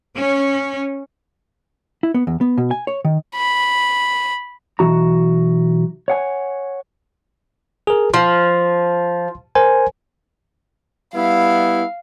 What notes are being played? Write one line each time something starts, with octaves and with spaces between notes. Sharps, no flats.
C#4
E4
B3
E2
B3
B2
G#5
C#5
D#3
B5
B1 G2 E3 F#4 A#5
C#5 F#5 G#5
G#4 A#4
F3 C6
A#4 C5 G#5
G3 B3 E4 F5